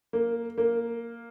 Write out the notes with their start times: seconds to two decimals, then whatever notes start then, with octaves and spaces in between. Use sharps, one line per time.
0.13 A#3
0.58 A#3